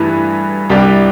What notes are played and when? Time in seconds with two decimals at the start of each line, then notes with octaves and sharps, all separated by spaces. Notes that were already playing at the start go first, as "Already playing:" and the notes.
Already playing: G2 E3 A3 E4
0.70 C2 C3 G3 D4 G4